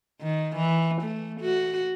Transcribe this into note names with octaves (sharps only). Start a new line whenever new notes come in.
D#3
E3
A3
F#4